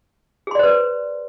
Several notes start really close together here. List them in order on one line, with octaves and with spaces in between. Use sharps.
G#4 C6 D5 C5 B4